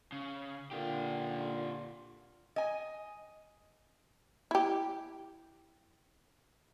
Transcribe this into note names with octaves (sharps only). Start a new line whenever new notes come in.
C#3
A#2 D3 F4 G4
D#5 G#5
E4 G4